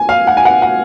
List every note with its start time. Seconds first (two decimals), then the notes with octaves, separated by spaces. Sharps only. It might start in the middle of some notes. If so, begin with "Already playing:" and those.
Already playing: G#5
0.09 F5
0.27 F#5
0.37 G#5
0.45 F#5
0.62 F#5